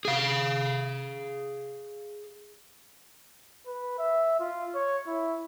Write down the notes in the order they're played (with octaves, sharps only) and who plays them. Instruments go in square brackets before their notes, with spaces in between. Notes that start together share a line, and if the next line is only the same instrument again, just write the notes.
[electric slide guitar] G#4 F5
[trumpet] B4
E5
F4
C#5
E4